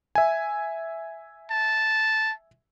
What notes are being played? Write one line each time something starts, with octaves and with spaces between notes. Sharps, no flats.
E5 G#5
A5